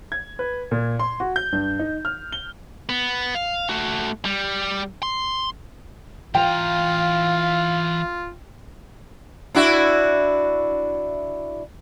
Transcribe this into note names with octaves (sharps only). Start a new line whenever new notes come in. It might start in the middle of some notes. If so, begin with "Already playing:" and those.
G#6
B4
A#2
C6
F#4
G6
G2
D#4
F6
G7
B3
F5
A3 F#4
G3
C6
E3 F4 F5 G5 A#5
D4 E4 F#4